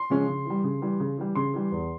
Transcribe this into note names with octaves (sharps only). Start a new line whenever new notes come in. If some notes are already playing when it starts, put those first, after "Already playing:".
Already playing: C6
C#3 F3 G#3 C#4
C#3
E3 G3
C#3
E3 G3
C#3
E3 G3
C#3 C6
E3 G3
E2